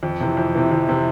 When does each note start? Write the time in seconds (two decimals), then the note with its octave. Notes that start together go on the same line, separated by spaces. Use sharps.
0.03 F2
0.20 C3 E3
0.37 F2
0.55 C3 E3
0.71 F2
0.89 C3 E3